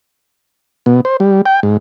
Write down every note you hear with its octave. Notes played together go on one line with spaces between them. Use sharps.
B2
C5
G3
G5
G#2